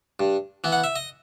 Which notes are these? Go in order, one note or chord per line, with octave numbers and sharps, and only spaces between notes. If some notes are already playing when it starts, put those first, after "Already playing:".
G2
E3 B3
F#5
E5
D#5